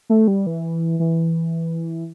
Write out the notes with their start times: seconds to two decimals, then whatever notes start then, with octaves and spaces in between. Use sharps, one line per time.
0.09 A3
0.28 G3
0.46 E3
1.00 E3